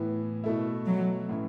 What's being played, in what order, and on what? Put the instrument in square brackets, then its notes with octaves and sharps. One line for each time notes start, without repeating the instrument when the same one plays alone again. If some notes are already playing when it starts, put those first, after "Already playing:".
Already playing: [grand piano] A2 E3 B3
B2 A3 E4
[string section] F#3
[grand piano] A2 E3 C#4 E4